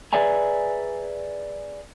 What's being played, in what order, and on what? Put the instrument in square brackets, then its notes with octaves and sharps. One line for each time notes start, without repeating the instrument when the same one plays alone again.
[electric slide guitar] G#4 B4 D5 E5 G#5 A#5